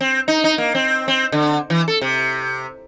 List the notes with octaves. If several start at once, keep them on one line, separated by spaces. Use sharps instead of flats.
C4
D#4
D#4
A#3
C4
C4
D3
E3
A4
C3